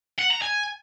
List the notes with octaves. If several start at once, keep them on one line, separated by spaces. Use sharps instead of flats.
F#5
A#5
G#5